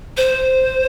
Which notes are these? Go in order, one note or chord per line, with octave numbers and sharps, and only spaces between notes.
C5